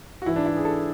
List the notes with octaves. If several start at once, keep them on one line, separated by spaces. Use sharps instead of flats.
F#4
G#2 E3 E4
D4
E4
G#4
A4